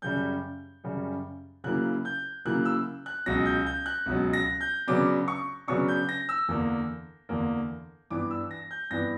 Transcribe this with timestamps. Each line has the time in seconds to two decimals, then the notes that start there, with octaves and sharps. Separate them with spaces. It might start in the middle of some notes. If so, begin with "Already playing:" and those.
0.02 F#2 C#3 G3 G6
0.84 F#2 C#3 G3
1.64 C#3 F#3 A#3 E4 F#6
2.05 G6
2.45 C#3 F#3 A#3 E4 F#6
2.65 E6
3.06 F#6
3.26 C#2 B2 F#3 A#6
3.46 G6
3.66 G6
3.86 F#6
4.06 C#2 B2 F#3
4.33 A#6
4.61 G6
4.87 C#3 F#3 B3 D4 D6
5.28 C#6
5.67 C#3 F#3 B3 D4 C#6
5.88 G6
6.09 A#6
6.29 E6
6.48 E2 D3 A#3
7.29 E2 D3 A#3
8.11 G2 E3 B3 D4 D6
8.31 E6
8.51 A#6
8.71 G6
8.91 G2 E3 B3 D4 A#6